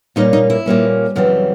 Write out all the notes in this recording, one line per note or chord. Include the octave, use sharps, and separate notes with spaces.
A#2 G3 A#3 C#4 D#4
D#4
E4
A#2 G3 A#3 C#4
F#2 C#3 E3 G3 C4